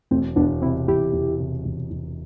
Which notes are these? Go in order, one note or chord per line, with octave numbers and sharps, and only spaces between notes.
E1 A3 C4
E1 B3 D4
C3 C4 E4
E1 E4 G4
E1
C3
E1
E1